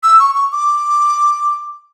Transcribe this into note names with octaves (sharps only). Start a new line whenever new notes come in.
E6
C#6
C#6
D6